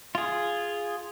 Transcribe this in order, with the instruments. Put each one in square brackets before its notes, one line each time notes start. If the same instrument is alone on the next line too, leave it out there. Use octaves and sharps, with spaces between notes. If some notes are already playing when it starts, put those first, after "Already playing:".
[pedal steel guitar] F4 G#4